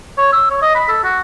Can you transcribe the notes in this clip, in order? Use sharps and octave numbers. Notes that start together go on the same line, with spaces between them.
C#5
E6
C#5
D#5
B5
A4
F#4